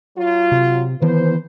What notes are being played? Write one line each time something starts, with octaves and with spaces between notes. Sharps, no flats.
F#3 F4
C3
D#3 E3 B3 B4 C5